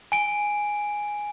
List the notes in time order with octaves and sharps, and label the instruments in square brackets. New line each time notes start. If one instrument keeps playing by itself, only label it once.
[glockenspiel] G#5 D7